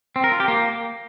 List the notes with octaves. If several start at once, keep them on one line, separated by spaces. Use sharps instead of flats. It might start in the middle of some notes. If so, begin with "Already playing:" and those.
C4
A#4
F4
G4
A#3